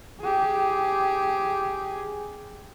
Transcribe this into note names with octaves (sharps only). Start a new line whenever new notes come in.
G4 G#4